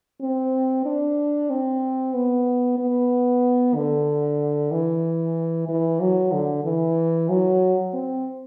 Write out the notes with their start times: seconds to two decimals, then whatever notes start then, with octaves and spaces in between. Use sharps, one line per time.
0.21 C4
0.85 D4
1.50 C4
2.14 B3
2.79 B3
3.75 D3
4.71 E3
5.69 E3
6.00 F#3
6.32 D3
6.64 E3
7.29 F#3
7.93 C4